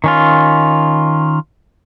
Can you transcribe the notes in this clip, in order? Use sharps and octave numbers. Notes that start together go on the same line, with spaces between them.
D#3 C#4 F4